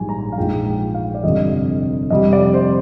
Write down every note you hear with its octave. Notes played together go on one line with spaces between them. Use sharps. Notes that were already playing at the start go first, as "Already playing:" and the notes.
Already playing: A#1 G#2 G3 G#5
A#5
F5
A#1 G#2 F3 G#3 G5
G5
F5
D5
G1 F2 C3 D#5
F2 C3 G3 D#5
D5
C5